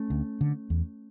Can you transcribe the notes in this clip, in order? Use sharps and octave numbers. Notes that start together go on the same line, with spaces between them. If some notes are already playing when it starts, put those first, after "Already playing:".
Already playing: A3 C#4
D2
D3
E2